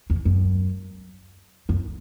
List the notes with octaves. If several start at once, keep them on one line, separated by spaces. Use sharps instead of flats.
E2
F#2
F#2